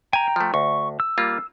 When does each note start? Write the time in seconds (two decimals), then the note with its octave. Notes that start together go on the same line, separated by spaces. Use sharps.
0.13 G5 G#5 A#5
0.36 F3 A3
0.54 D2 C#6
1.00 E6
1.18 G3 A#3 F4